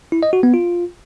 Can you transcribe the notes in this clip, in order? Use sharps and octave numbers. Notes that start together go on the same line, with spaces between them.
E4
D#5
F#4
B3
F4